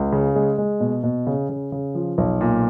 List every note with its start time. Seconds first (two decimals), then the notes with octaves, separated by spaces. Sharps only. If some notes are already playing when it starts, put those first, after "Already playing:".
Already playing: C#2
0.12 C#3
0.35 G#3
0.58 G#3
0.80 B2
1.03 B2
1.27 C#3
1.49 C#3
1.72 C#3
1.95 F3
2.18 B1
2.41 A#2